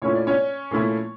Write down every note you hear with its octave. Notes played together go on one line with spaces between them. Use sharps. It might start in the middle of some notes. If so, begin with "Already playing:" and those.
A#2 F3 A3 C#4 E4 C#5
D5
C#4 C#5
A#2 F3 A3 C#4 E4